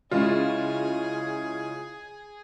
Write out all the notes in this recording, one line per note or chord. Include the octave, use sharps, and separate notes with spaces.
C#3 G#3 C#4 E4 F4 G#4